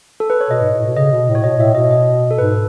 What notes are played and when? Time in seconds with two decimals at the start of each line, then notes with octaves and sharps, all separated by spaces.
0.20 A4
0.30 B4
0.41 C#5
0.50 B2 D#5
0.61 G#2
0.74 A2
0.86 B2
0.96 C#3 D#5
1.12 B2
1.29 A2
1.35 C#5
1.44 B2 D#5
1.59 A2 E5
1.75 B2 D#5
1.91 D#5
2.31 A4
2.38 G#2 B4